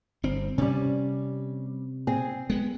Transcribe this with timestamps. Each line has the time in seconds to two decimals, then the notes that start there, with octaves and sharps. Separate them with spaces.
0.23 G1 C4
0.58 C3 G3 C#4
2.07 C4 G#4
2.50 G#3 B3